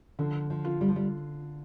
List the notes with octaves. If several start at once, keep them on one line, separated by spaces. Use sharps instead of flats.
D3 F3
F3
F4
G3
F3
G3